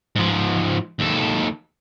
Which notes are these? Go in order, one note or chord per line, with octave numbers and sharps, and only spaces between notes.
G#2 F3
D#2 A4